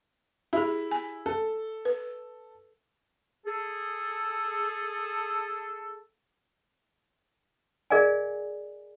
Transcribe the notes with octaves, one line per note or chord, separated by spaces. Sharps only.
E4 G4 G#4
G#5
A4
B4
G#4 A4
G#4 A#4 D5 D#5 F5 G#5